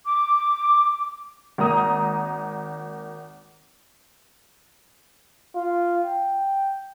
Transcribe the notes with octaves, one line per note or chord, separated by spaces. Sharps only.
D6
G#1 A#3 A#5 D#6
F4
G5